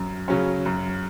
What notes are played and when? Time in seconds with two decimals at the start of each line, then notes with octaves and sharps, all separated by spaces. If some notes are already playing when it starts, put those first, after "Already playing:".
Already playing: F#2
0.28 C#3 F#3 C#4
0.66 F#2